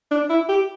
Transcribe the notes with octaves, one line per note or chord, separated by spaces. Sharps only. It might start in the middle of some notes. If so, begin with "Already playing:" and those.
D4
E4
G4